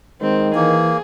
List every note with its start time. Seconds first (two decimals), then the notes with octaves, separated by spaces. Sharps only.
0.22 D#3 G#3 C4
0.55 E3 A#3 G#4